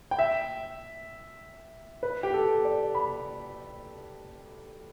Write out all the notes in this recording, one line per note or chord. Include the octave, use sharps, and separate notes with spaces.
G5
E5
B4
G4
A4
D5
B5